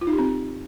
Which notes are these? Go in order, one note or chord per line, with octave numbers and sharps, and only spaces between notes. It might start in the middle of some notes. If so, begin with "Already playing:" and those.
F4
D#4
G4
C4